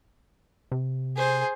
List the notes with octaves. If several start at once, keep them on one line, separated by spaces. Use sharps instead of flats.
C3
G#4 C5